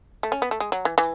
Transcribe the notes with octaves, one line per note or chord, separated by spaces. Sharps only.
A3
C#4
B3
A3
G#3
F#3
E3
E3